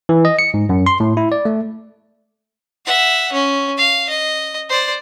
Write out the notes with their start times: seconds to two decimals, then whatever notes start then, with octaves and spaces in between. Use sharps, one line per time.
0.09 E3
0.25 D#5
0.39 C#7
0.54 G#2
0.69 F#2
0.86 C6
1.00 A2
1.17 E4
1.32 D5
1.45 A3
2.86 E5 F#5
3.33 C#4
3.77 F5
4.09 D#5
4.69 C5 D5